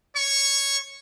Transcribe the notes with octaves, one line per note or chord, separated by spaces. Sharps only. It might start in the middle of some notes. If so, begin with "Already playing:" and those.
C#5 C#6